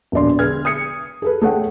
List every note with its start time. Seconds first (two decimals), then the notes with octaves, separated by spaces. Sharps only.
0.12 E1 A#1 D5 C6
0.39 D3 G#4 B4 F6 G#6
0.65 D#6 G#6 C#7
1.22 G#4 A4 B4
1.42 A3 G#4 A4 C#5 F#5 G5